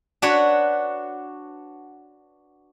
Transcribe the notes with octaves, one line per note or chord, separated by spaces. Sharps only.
D4 F#4 B4 C#5 F#5